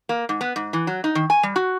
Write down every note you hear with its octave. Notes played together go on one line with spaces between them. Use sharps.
A#3
G#2
B3
G#2
E3
F#3
D#4
D#3
G#5
G3
F#4